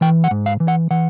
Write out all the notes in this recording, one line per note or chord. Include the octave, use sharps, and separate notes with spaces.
E3 G5
F#5
G#2
F5
E3
F#5
E3 F#5